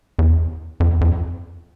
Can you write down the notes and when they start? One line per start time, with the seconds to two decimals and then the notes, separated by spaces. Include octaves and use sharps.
0.19 E2
0.80 F2
0.90 E2
1.01 F2